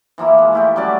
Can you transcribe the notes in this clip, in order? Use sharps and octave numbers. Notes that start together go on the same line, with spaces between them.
E3 F3 A#3 E4
G#3
A3 E4 G4
F#3 G3 C#4 D5